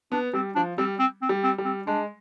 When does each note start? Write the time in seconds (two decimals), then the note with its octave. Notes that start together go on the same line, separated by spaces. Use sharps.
0.12 B3 D4
0.33 G3 C4
0.55 F3 D4
0.78 G3 C4
0.99 C4
1.22 C4
1.29 G3
1.44 C4
1.58 G3
1.65 C4
1.87 G#3 D4